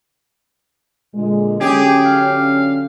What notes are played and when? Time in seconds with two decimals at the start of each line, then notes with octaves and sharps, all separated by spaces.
1.15 A#2 D3 G#3
1.61 D3 F#3 C#4 G4 G#4
2.05 F5